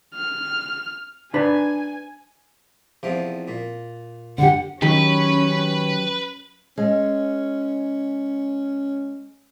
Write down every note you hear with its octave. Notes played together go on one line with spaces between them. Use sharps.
F6
D4 B4 G#5 A#5
E2 C3 F3
A#2
D3 G4 F#5
D#3 F#3 C#4 G4 B4
G#3 C#4